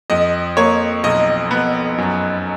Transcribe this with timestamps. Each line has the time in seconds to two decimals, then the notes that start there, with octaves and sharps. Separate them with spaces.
0.10 F2 D#5
0.57 A#3 C#5
1.04 B1 D#5
1.51 B3
1.98 F#2